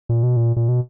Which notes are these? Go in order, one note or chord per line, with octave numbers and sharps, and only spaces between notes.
A#2
B2
A#2
A#2
B2